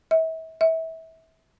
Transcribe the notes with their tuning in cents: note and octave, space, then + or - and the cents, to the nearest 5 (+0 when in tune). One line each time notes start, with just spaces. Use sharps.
E5 -35
E5 -25